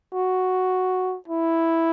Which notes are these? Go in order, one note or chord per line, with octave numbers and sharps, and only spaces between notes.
F#4
E4